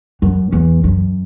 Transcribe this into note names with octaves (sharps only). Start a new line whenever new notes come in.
F#2
E2
F#2